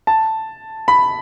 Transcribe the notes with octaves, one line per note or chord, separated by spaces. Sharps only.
A5
B5